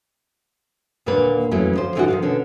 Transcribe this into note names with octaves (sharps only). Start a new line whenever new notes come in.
D#2 A#2 D3 A#3 B4
F2 C#3 E3 F#3 A3 C#4
D2 F3 C5
A2 D3 E3 C#4 D#4 F#4
D#3 F3 F5
B2 D3 C#4